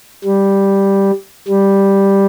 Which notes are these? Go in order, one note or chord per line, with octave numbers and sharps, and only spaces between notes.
G3
G3